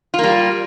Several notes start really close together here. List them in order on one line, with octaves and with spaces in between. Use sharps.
F4 A#3 G3